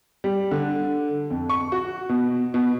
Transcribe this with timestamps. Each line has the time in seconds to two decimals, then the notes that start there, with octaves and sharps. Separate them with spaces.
0.24 G3
0.51 D3
1.30 F2
1.50 C#6
1.72 F#4
2.09 B2
2.54 B2